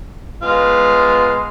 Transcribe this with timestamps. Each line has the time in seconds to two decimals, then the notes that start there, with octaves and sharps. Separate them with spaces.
0.43 G#3 B3 F4 F5